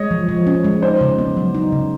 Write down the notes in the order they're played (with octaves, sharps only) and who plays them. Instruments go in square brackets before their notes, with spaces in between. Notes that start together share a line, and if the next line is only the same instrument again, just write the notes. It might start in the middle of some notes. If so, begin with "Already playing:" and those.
Already playing: [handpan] G#3 [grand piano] C#5 D#5
[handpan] F3
F3
C#4
G#3
[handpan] D#4 [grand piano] C5 D5
[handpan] C#3
B3
F#3
D#4
C#3